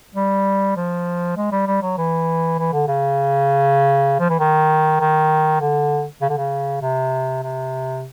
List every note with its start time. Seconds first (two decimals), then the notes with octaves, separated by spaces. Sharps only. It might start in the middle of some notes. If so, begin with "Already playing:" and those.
0.15 G3
0.77 F3
1.37 G#3
1.52 G3
1.67 G3
1.82 F#3
1.98 E3
2.59 E3
2.73 D3
2.88 C#3
4.20 F3
4.30 E3
4.40 D#3
5.00 D#3
5.61 D3
6.22 C#3
6.29 D3
6.37 C#3
6.81 C3
7.43 C3